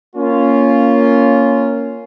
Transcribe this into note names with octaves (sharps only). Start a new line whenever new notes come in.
A#3 C#4 F4